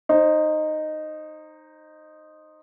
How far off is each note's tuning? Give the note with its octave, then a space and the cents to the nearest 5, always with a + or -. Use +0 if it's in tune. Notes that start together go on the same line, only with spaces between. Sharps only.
D#4 -10 C5 +15